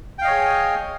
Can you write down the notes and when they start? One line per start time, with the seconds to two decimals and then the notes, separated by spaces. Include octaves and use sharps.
0.18 G5
0.21 F5
0.24 D#5
0.27 C#5
0.30 G#4